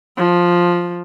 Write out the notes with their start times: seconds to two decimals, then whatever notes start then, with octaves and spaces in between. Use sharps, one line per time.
0.17 F3